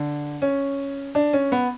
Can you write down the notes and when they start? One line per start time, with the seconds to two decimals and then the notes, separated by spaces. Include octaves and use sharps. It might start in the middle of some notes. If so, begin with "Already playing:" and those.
Already playing: D3
0.42 C#4
1.15 D4
1.33 C#4
1.52 B3